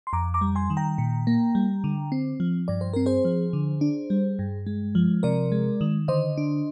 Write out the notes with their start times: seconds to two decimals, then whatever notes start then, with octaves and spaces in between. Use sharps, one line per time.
0.07 C6
0.13 F2 A#5 D6
0.34 A#5 D6
0.41 G3
0.56 G#5 C6
0.70 D#3
0.77 G5 A#5
0.98 A#2
1.27 A#3
1.55 G3
1.84 D3
2.12 C4
2.40 F3
2.68 G2 D5
2.81 C5
2.93 C4 A#4
3.06 G#4 C5
3.25 F3
3.53 D3
3.81 D4
4.10 G3
4.39 G2
4.67 G#3
4.95 F3
5.23 C3 A#4 D5
5.52 G#3
5.81 D#3
6.08 D3 C5 D#5
6.38 D4